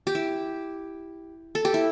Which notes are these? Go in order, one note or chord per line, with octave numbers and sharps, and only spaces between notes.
G4
E4
A4
G4
E4